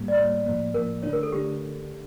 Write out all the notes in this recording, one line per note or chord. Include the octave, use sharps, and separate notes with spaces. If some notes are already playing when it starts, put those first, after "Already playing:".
Already playing: A2 G3 A#3
D5
A2 G3 A#3 C#5
A2 F3 A#3
A2 F3 A#3 A#4
D3 A3 D4 C#5
A#4
A4
D3 A3 D4 G4